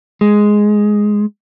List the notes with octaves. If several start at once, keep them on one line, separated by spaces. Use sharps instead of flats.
G#3